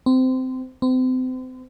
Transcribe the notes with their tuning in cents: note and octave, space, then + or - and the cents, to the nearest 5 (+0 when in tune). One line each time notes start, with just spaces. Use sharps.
C4 -20
C4 -35